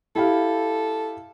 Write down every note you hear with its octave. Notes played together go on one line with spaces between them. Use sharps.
E4 G4 A4 F5